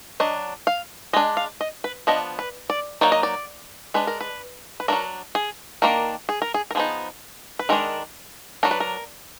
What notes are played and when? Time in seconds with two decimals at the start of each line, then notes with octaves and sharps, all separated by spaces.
0.20 F#3 D4 D#5
0.67 F5
1.13 G#3 D4 D#5
1.37 F5
1.61 D#5
1.84 B4
2.07 F3 B3 D4 D#5
2.39 B4
2.70 D5
3.01 F#3 A#3 D#4 D5
3.12 D#5
3.23 D5
3.94 G#3 D4 B4
4.07 A#4
4.21 B4
4.80 B4
4.88 A#3 D4 A#4
4.92 F#3
5.35 G#4
5.82 D#3 A#3 D4 A#4
6.29 G#4
6.42 A#4
6.54 G#4
6.71 A#4
6.75 F3 B3 D#4 G#4
7.59 B4
7.69 D#3 G#3 D4 A#4
8.63 F#3 D4 A#4
8.71 B4
8.80 A#4